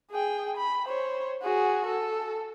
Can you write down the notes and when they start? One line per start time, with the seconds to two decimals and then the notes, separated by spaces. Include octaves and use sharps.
0.11 G#4 G5
0.57 B5
0.86 C5 C#5
1.43 F#4 G#4
1.87 A4